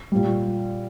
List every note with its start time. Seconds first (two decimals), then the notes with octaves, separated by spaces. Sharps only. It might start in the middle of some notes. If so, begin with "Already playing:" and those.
0.12 A#2 G3